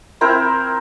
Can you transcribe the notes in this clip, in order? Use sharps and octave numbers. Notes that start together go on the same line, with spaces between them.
C4 E4 A#4 C5